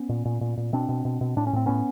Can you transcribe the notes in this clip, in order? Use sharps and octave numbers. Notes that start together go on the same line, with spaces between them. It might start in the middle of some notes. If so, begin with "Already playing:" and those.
Already playing: B3 C#4
A#2
A#2
A#2
A#2
B2 C4 D4
B2
B2
B2
A2 D4
C#4
A2 C4
A2 B3 C#4